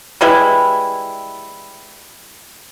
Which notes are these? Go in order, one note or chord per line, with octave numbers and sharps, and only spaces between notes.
E3 G3 G#3 E4